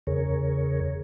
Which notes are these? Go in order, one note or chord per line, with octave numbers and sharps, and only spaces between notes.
E2 C#3 G#4 A#4 C#5